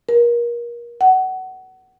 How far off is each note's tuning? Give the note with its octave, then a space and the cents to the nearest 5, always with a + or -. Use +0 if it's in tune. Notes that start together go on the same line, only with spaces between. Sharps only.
A#4 +30
F#5 +20